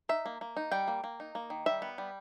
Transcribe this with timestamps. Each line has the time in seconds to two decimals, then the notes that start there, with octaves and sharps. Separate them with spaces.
0.09 D#4 E5
0.26 A#3
0.41 A#3
0.57 D#4
0.71 G3 G5
0.88 A#3
1.04 A#3
1.20 D#4
1.35 A#3
1.50 D#3
1.66 G3 E5
1.82 B3
1.98 G3